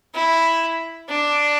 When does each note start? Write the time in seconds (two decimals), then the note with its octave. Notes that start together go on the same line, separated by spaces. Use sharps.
0.14 E4
1.09 D4